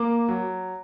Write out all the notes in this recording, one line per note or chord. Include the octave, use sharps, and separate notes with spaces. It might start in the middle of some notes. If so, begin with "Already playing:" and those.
Already playing: A#3 D6
F#3